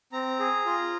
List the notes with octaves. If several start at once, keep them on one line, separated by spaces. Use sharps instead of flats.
C4 A#5
G#4
F4